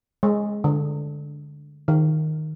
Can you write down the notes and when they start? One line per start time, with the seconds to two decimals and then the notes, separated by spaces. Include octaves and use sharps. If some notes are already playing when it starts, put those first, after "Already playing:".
0.23 G#3
0.64 D3
1.88 D#3